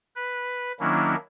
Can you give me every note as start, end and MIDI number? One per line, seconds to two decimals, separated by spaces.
0.16 0.72 71
0.80 1.15 51
0.80 1.15 54
0.80 1.15 58
0.80 1.15 61
0.80 1.15 62
0.80 1.15 64